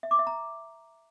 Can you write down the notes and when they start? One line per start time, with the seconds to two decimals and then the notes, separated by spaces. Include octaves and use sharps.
0.03 E5
0.11 D6
0.19 E5
0.27 A#5